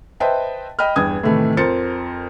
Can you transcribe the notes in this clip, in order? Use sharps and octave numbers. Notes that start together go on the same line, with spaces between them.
B4 C5 D#5 E5 G5 A5
D#5 G5 B5 F6
E2 G2 G5 D#6 G#6
A2 C3 D#3 E3 A3
F2 A#4 C5 A6 C#7